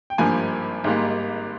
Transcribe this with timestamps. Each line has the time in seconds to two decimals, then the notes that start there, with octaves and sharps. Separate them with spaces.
0.10 G5
0.18 G#1 G2 F3 A#3 G#5
0.84 G#1 G#2 G3 A#3